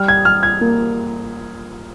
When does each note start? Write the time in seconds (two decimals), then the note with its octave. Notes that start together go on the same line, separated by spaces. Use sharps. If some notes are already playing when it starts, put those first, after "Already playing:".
Already playing: G3 F6
0.08 G#6
0.25 G3 F6
0.43 G#6
0.61 A#3